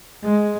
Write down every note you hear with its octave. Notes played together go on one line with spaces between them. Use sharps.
G#3